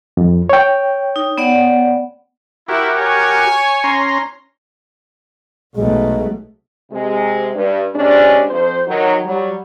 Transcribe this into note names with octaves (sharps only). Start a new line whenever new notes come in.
F2
C#5 G5
D#4
B3 D5 F#5
E4 F#4 G4 A#4
C#5 G#5
C#4 A#5 C6
B1 B2 G#3 A3
C3 G#3
G2
C3 G#3 C#4 D4
F2 C5
D#3 F#3
F#3 G3